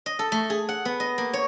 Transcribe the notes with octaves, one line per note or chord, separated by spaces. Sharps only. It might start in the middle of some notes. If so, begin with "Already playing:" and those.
D#5
A4
A3
G#4
F#5
B3
D#5
A#3
C#5